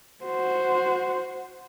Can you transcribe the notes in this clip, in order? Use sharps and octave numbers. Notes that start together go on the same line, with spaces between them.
F#4 C5